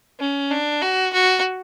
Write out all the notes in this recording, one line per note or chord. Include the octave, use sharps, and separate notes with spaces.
C#4
D4
F#4
F#4